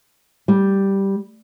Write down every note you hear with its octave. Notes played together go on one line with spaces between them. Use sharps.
G3